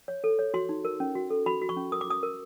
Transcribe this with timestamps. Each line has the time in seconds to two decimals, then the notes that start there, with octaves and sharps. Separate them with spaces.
0.08 C#5
0.24 A4
0.39 C#5
0.54 F#4 C6
0.69 D#4
0.85 A#4
1.00 C#4
1.16 F#4
1.30 A4
1.46 F#4 B5
1.62 F#4
1.69 C#6
1.77 C#4
1.92 A#4 D#6
2.01 D6
2.08 F#4 D#6
2.23 A#4